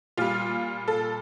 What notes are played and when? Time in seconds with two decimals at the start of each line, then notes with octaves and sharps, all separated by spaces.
0.17 A#2 G3 F4
0.88 A4